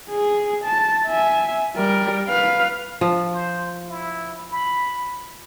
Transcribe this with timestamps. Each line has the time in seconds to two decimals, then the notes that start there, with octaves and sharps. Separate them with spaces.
0.10 G#4
0.65 A5
1.07 E5 G#5
1.76 G3 A#4
2.29 B4 F5
3.01 F3
3.33 C5
3.89 E4
4.51 B5